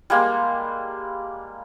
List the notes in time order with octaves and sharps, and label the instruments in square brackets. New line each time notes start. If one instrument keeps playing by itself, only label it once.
[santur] G3 G#3 A#3